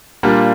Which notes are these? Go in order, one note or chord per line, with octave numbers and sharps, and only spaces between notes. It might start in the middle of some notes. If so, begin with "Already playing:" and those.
A#2 G3 A#3 D4 F4